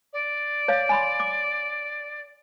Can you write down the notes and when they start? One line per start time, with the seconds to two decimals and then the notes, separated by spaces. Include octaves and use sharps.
0.13 D5
0.68 C#5 F5
0.89 G#5 B5 C6
1.20 D6